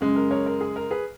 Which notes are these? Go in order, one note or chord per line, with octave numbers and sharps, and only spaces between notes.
F#2 C#3 G#3
A#4
A#4 C#5
A#4
G#4
A#4
G#4 B4